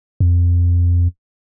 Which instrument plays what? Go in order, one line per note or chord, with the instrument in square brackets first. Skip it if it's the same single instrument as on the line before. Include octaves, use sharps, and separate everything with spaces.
[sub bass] F2